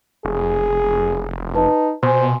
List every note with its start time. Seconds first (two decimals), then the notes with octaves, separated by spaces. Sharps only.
0.25 F1 G#4
1.55 D#4 B4 A5
2.03 B2 C5 G#5 C6